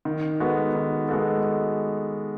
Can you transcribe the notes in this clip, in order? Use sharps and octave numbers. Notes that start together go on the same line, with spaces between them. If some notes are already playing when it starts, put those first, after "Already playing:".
D#3
G#3 B3 F#4 A4
D#3
G#3 B3 F#4 A4